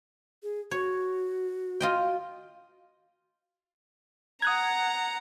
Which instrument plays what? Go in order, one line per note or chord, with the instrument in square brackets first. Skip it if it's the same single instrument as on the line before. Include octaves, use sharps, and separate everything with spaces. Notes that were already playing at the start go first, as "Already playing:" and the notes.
[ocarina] G#4
[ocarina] F#4 [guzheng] C#5
[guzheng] F4 D#5 G5
[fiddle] F#5 A#5 [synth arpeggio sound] D#6 F#6 G#6